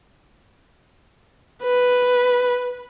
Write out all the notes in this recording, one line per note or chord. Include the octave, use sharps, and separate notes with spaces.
B4